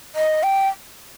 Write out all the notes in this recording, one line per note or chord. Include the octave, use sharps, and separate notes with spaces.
D#5
G5